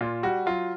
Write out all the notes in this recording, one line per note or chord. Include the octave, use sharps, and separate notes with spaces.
A#2 F4
G3 F#4
F#3 F4